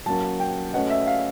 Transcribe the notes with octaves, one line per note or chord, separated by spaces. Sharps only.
F#3 A#3 C#4 F#4 A#4 A5
G5
A3 C#4 F#4 B4 D#5 F#5
E5
F5